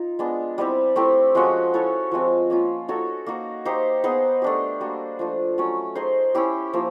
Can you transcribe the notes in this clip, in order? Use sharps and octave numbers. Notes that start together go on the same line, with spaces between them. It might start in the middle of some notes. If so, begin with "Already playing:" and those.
Already playing: D#4 F4
G#3 B3 D4
G3 C4 E4 G4
A3 C4 E4 G4
F3 G#3 C#4 F#4
E4 A4 C#5 E5
F3 G#3 C4
A#3 C#4 F4
D#4 F#4 A4 C#5
A#3 D#4 F#4
A#3 D#4 G4 C5
B3 D#4 G#4 C5
A3 D4 G4
G3 A#3 D4 F#4
F3 A3 D4
F#3 A3 C#4
D#4 G#4 C5
C#4 E4 G4
F3 A#3